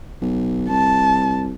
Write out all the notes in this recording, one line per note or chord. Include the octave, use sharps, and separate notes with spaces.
B1
C2 A5